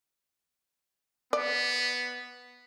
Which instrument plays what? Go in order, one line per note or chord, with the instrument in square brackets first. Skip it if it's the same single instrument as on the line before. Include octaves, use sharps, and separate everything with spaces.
[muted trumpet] B3 [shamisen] D5